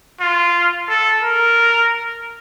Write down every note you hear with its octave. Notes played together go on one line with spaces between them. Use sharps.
F4
A4
A#4